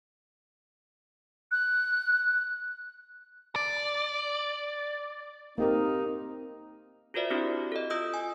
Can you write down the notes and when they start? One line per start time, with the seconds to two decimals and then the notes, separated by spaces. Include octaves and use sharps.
1.52 F#6
3.56 D5
5.58 A#3 C4 D#4 G4 A#4
7.14 F4 F#4 A#4 C5 D5 E5
7.30 C4 D4 E4 F#4 G4
7.72 A4 D#5
7.90 F4 D#5 D#6 E6 G6
8.14 G#5